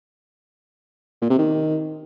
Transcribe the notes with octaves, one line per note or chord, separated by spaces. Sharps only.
A#2
C3
D#3